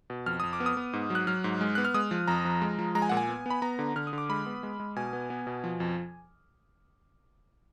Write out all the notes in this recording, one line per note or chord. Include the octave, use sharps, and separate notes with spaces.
B2
F2 F6
F2 D#6
D6
B3
D#6
B3
G#2
F#3
F#6
F#3 F6
G#2
G#3
B3 F#6
F6
G#3 D#6
F3
F2 A#5
F3
G#3
F3
G#3 A#5
G#5
A#2 F#5
G#5
B3
B3 B5
B3 A#5
D3
D3 F6
D#6
D3
D6
G#3 B5
B3
G#3
G#3
B2 G#5
B3
B3
B2
F3
F2